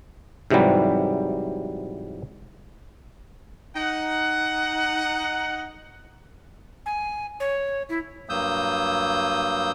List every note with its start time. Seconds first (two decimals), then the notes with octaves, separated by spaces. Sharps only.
0.50 G#2 C3 E3 F#3 G3
3.76 D#4 F#5
6.86 G#5
7.40 C#5
7.89 E4
8.29 G2 F#3 A#3 D#6 E6 G6